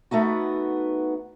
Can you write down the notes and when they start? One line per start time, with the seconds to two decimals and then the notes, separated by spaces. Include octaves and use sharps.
0.11 A3 B3 D#4 F#4